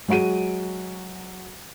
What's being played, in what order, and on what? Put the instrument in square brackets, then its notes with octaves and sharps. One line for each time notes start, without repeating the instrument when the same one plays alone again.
[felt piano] F#3 G#3 F#4 D7 D#7